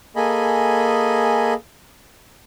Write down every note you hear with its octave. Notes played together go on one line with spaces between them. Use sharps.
A#3 G#4 A4 D#5 G#5 B5